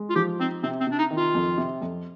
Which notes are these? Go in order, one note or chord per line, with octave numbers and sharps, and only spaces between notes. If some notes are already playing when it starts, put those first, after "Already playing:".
Already playing: G#3
F4
F3 G4
C4 D#4
C3 C4
C4
C3 D4
D#4
D#3
F4
F2
C3
F2